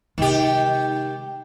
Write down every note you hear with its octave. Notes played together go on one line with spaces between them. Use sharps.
C3 D#3 G#3 G4